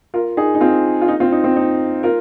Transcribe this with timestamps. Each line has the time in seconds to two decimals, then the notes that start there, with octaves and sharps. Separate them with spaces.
0.14 F4 A#4
0.37 D#4 G#4
0.54 D#4
0.61 C4 F4
1.02 F4
1.08 D#4
1.20 C4 F4
1.32 D#4
1.44 C4
1.56 D#4
2.03 F4 A#4